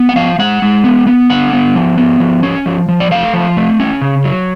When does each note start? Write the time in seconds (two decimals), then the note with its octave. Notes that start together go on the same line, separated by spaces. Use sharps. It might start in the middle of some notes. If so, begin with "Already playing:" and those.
Already playing: B3
0.09 F#5
0.16 F3 F5
0.39 G#3 F#5
0.62 G#3
0.84 B3
1.07 B3
1.30 D3 F#5
1.53 B3
1.75 F3
1.98 B3
2.20 F3
2.43 C#4
2.66 F3
2.88 F3
3.00 D5
3.11 A3 F5
3.34 F3
3.57 A3
3.80 C#4
4.02 C#3
4.24 F#3